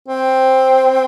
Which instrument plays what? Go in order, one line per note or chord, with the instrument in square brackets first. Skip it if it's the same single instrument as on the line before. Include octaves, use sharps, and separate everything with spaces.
[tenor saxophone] C4